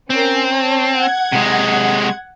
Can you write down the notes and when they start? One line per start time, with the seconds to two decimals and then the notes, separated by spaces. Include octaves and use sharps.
0.10 C4 C#4 A#4
0.51 C#5 A5
0.95 F#5 G#6
1.32 C3 G#3